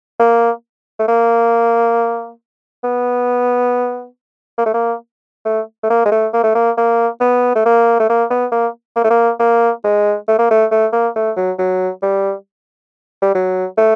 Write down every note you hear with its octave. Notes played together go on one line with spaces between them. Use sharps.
A#3
A3
A#3
B3
A#3
A3
A#3
A3
A3
A#3
G#3
A3
A#3
A3
A#3
A#3
B3
A3
A#3
A3
A#3
B3
A#3
A#3
A3
A#3
A#3
G#3
A3
A#3
A3
A3
A#3
A3
F#3
F#3
G3
G3
F#3
A3